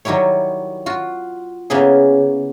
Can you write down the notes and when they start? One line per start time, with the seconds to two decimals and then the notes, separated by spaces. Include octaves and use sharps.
0.05 D#3 F#3 G3 E4 C#5
0.86 F4 F#4
1.70 C#3 A#3 B3 E4 G#4